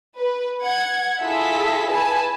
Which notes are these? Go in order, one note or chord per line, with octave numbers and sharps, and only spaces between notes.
B4
F#5 G#6
E4 F4 G#4 A4 E5 B6
B4 G#5 A5 B5